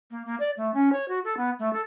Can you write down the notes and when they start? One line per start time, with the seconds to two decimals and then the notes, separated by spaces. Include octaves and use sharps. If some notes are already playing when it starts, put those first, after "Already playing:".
0.10 A#3
0.25 A#3
0.40 D5
0.56 A3
0.73 C#4
0.92 C#5
1.08 F#4
1.24 A4
1.37 B3
1.59 A3
1.73 A4